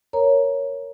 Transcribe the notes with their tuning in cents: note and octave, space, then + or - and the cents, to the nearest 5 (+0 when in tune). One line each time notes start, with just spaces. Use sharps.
A#4 +0 C#5 +0 A#5 +0